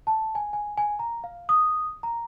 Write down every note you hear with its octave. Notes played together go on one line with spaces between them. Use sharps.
A5
G#5
G#5
G#5
A#5
F5
D#6
A#5